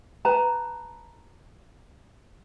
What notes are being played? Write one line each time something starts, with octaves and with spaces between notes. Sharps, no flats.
B4 A5 A#5